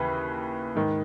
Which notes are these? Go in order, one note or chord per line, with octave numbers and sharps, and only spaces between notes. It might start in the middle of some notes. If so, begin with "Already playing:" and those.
Already playing: D#2 C#3 E3 B4
G#2 D#3